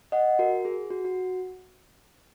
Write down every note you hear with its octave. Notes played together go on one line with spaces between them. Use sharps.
D#5 F#5
F#4 A#4
G#4
F#4
F#4